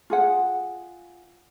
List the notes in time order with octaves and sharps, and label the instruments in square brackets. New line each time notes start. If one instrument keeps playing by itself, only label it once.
[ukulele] F4 G#4 F#5